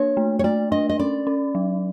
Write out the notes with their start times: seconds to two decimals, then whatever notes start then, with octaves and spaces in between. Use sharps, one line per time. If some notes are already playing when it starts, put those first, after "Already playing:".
Already playing: A#3 D4 C#5
0.17 A3
0.39 C#5
0.44 A3 D5
0.72 D4 D#5
0.89 D#5
0.99 C#4 D5
1.27 C#4
1.55 F#3